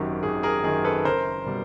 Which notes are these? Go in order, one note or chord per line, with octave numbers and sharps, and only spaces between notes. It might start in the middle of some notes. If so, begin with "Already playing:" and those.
Already playing: G#1 F#2 D#3 F#3 G4
G#1 G#4
G#4 A#4
F#2 D#3 F#3 G#4
A4 B4
F#1 A#4 C5
B2 G3